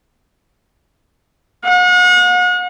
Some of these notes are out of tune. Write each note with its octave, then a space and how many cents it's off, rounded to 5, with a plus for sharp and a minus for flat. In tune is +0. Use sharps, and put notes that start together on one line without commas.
F#5 -40